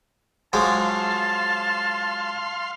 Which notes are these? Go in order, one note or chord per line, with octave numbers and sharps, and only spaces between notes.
F3 F#3 G#3 F5 A5 C6